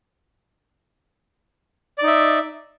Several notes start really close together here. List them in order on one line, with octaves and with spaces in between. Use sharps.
D5 D#4 E5